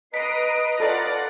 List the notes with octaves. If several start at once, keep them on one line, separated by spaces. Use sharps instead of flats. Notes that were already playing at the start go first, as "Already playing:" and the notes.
B4 D#5 A#5 D#6 B6 C7 D7
F4 A4 D5 F#5 A#6